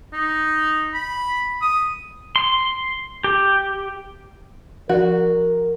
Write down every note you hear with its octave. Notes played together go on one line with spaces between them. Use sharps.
D#4
B5
D#6
C6
G4
F3 F#4 A#4 D5